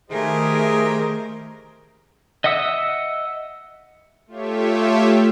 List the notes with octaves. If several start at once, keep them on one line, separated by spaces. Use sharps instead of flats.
D#3 A3 G4 G#4 A#4 C5 D#5 E5
D#5 E5 F#5 D#6 E6
A3 F4 G4 C#5 E5